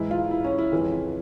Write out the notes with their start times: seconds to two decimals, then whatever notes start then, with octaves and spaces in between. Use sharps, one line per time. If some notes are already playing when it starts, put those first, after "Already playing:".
Already playing: G#2 E3 E4
0.11 F4
0.31 E4
0.44 C#4
0.58 E4
0.72 F2 C#3 E3